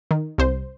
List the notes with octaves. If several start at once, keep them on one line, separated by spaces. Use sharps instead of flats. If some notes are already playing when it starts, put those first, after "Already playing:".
D#3
C2 C5